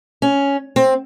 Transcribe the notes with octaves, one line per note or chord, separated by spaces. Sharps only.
C#4
C4